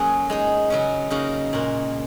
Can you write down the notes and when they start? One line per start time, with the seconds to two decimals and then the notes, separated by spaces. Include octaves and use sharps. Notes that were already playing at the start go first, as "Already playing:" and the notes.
Already playing: F#3 A#3 C#4 G#4
0.30 G#3 D#4 G#4
0.70 C#3 F#3 C#4
1.10 C#3 A#3 D#4 F#4 A#4
1.53 A#2 G#3 F#4 A#4